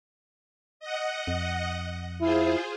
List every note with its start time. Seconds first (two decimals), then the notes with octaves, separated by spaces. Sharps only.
0.80 D#5 F#5
1.27 F2
2.21 E4 F4 G#4 C5